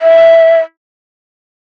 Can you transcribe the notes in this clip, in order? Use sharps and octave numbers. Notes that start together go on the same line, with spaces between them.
E5